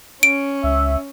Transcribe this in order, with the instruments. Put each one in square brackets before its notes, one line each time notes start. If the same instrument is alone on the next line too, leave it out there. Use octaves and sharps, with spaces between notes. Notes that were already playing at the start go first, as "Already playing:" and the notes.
[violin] C#4 [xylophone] D7
[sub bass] C#2 [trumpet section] E5